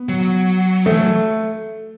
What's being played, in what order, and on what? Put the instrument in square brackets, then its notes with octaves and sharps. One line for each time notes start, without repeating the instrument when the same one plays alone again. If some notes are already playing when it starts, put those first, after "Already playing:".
Already playing: [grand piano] B3
[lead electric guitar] F#3
[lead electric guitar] E3 [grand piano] A3
[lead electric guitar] F#3